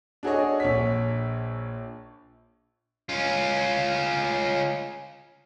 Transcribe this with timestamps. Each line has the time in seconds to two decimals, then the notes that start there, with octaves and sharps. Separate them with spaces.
0.23 D4 F#4 G#4 A4 C#5 D#5
0.60 A#1 C#5 B6
3.09 C#4 F4